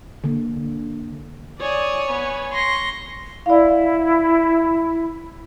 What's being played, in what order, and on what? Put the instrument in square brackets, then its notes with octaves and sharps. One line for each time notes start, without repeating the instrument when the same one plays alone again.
[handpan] D3 A#3
[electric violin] C#5 G#5 [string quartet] D5 D#6
[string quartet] B3
C6 C#6 A#6
[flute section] E4 [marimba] D5 F5